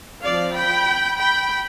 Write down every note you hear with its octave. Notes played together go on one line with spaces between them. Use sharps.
F3 C4 D5 F5
G5 B5
G5 B5